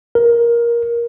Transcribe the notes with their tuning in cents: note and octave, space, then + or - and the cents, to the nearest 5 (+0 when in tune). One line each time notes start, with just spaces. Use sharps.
A#4 +15